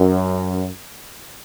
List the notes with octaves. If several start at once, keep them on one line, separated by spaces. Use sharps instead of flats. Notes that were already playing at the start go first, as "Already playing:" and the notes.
Already playing: F#2